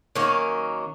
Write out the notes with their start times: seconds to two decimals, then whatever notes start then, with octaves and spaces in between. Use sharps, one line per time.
0.16 D#3 F#3 A#3 C#4